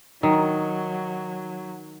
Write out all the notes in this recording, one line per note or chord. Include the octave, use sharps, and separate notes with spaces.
D#3 F#3